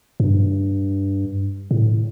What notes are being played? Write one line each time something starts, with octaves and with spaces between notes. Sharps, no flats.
G2
A2